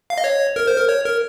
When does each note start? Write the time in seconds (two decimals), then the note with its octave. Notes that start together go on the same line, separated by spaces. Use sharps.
0.10 F5
0.18 D#5
0.24 C#5
0.56 A#4
0.67 C5
0.78 A#4
0.89 C#5
1.05 A#4